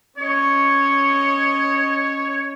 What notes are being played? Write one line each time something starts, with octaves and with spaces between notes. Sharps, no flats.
C#4 C#5 D#5